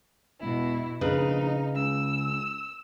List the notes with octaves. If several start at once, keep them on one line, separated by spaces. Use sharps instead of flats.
E1 B2 E4
A#1 C#3 D#4 B4
C#2 E6